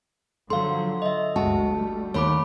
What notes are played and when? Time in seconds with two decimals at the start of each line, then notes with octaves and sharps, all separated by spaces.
0.50 D3 F3 F#3 A4 F5 C6
1.02 D#5 E5
1.36 G1 D2 G#3 F#4 A5
1.71 G3 A3
2.14 D#2 D#3 C#5 B5 D6